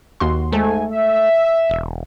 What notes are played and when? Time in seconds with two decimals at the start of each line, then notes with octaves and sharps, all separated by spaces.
0.20 D#2 F#4 C6
0.52 G#2 G#3 A3 A4 G#5
0.92 E5
1.70 E1